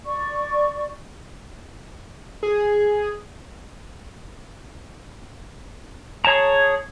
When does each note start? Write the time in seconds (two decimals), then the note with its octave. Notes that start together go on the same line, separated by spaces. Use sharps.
0.05 D5 C#6
2.43 G#4
6.25 G#4 C#5 A5 A#5